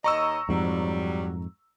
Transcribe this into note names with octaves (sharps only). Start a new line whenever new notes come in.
D#2 C#5 D#5 A#5 C#6 E6
F2 G#2 F#3 G3